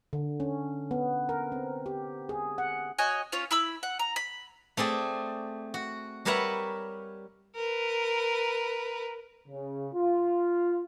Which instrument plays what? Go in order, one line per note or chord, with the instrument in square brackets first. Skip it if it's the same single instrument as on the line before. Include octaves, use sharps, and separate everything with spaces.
[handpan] D3
C#4
B3
A#4
C4
G4
G#4
F#5
[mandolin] F#4 C#5 D#5 G#5
C#4 F4 C#5
E4 B5 E6
F#5
A#5
B5
[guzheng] A3 C4 G#4 D5
F#4
G3 A#4 B4 C#5 E5 F#5
[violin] A#4 B4
[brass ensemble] C#3
F4